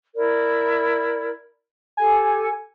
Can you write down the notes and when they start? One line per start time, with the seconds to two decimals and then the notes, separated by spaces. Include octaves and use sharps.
0.15 E4 A#4 D5
1.97 G4 A4 G#5